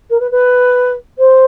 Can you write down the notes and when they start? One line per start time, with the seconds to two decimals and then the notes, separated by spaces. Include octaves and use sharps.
0.10 A#4
0.20 B4
0.31 B4
1.18 C5